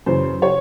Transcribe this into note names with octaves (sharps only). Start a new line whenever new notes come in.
F#2 C#3 E3 C5
C#5